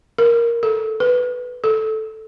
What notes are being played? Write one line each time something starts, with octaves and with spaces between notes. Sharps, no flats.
A#4
A4
B4
A4